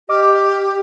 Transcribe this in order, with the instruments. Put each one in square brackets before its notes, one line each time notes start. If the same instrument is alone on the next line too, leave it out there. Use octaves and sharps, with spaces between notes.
[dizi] G4 [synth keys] D#5 D6 F6